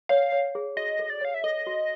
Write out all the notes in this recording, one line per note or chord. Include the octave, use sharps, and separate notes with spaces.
C#5 F5
C#5
G#4
F#4 D#5
A4
D5
C#5 F5
E5
A4 D#5
F#4